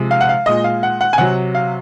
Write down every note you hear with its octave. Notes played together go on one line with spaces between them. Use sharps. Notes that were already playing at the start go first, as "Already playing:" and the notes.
Already playing: C3 F3 G#3
F5
F#5
F5
A#2 G#3 D#5
F5
F#5
F#5
G#5
C3 F#3 F#5
F5